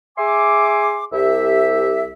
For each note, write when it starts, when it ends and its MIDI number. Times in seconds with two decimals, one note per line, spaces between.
0.17 1.05 68
0.17 1.05 76
0.17 1.05 80
0.17 1.05 84
0.17 1.05 86
1.13 2.12 36
1.13 2.12 67
1.13 2.12 76